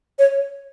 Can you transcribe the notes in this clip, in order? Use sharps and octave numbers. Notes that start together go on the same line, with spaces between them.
C#5